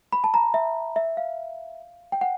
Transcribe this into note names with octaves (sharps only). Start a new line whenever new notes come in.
B5
A5
A#5
E5
E5
F5
G5
F#5